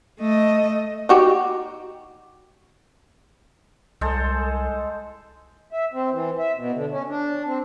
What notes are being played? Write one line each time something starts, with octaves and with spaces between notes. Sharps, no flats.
A3 D#5
D#4 F#4 G4
C2 G#3 A4 C5
E5
C4
E3
E5
B2
D3
C#4
D4
C4